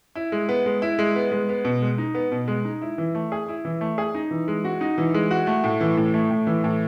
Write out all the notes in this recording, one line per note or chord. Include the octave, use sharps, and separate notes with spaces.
E4
G#3
B3
G#3
E4
G#3
B3
G#3
B3
B2
G#3
D#4
B3
B2
G#3
D#4
E4
E3
A3
G#4
E4
E3
A3
G#4
D#4
E3
G#3
F#4
D#4
E3
G#3
F#4
A3
A2
E3
A2
A3
A2
E3
A2